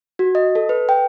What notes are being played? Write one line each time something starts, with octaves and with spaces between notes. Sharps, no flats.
F#4
D#5
A4
B4
G5